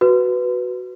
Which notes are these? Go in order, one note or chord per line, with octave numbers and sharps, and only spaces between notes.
F#4 B4